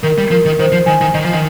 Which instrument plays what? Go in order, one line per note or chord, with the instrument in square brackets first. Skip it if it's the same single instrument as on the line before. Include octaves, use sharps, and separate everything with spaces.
[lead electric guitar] D#3 [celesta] A#4
[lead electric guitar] G3
[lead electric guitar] F3 [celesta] A#4
[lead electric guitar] D#3
[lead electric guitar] D#3 [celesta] C5
[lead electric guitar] F3
[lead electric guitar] D#3 [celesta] G#5
[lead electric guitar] D#3
[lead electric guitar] D#3 [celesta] D#5
[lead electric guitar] F3
D#3